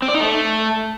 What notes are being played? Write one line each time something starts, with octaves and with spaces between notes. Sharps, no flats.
C4
D5
D#4
A3